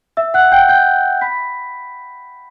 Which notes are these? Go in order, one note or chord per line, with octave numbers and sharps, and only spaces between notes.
E5 E6
F#5 F#6
G5 G6
G5 G6
B5 B6